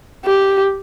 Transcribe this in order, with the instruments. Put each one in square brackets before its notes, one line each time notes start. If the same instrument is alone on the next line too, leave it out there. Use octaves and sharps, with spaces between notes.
[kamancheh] G4